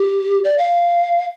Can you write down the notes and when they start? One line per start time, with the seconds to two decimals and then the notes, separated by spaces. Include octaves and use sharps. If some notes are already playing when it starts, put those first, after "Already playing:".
Already playing: G4
0.44 D5
0.58 F5